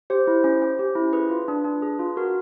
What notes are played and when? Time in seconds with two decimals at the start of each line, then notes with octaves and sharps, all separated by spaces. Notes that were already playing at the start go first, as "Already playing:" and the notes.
0.10 G4 C5
0.27 E4
0.44 C#4
0.62 C#4
0.79 G4
0.95 E4
1.13 G#4 B4
1.30 F4
1.48 D4
1.64 D4
1.82 G#4
1.99 F4
2.17 F#4 A#4